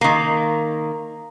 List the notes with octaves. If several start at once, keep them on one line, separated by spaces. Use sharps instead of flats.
D#3 A#3